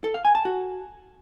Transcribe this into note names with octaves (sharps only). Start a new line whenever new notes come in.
A4
F5
G#5
A5
F#4